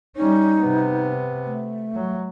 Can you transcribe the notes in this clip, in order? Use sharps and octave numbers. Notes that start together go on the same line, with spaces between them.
G3 C#4 D#4
C3 B3
A3
F#3